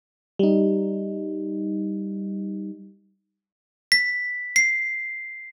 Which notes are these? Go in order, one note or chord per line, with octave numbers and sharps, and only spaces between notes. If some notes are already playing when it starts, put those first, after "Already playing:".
G3 D#4
B6
C7